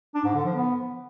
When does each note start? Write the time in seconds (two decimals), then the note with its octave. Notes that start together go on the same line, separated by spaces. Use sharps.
0.15 D4
0.25 G#2
0.35 D3
0.45 F3
0.55 B3